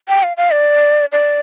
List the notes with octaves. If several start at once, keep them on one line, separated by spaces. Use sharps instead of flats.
G5
F5
F5
D5
D5